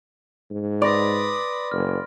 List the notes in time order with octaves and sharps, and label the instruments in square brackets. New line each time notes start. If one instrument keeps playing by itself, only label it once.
[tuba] G#2
[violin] B4 D#6 [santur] D5 [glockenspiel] B5 C6 A#6
[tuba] F#1 [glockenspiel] F6